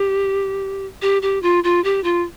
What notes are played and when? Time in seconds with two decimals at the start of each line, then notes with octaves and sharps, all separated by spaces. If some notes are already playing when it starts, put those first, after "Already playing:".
Already playing: G4
1.02 G4
1.22 G4
1.42 F4
1.64 F4
1.84 G4
2.04 F4